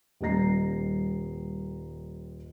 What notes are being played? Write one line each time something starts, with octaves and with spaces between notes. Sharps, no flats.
D#1 G3 D#5 A#5 A#6 C7